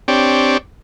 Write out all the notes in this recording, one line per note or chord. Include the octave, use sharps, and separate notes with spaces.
C4 D4 G4 C#5 D5